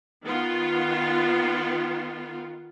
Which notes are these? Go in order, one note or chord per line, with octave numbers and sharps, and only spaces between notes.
D#3 B3 F4